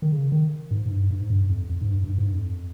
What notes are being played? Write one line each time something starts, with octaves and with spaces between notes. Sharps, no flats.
D#3
C#3
D#3
G#2
G#2
G2
G2
G#2
G2
F2
F2
G#2
G2
G2
G#2
G2
F2